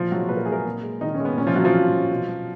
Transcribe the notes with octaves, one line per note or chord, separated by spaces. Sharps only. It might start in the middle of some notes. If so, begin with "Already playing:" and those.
Already playing: A#2 F3 F4
F#3 G#3 F#4
A#2 B4
A#4
G#3 G#4
A#3 A#4
A#2
G#3
A#2 D#3 D#4
C#4
G#3
B3
A#2 C#4
F3 F4
F#3 F#4
F3 F4
A#2
F#3
B2
F#3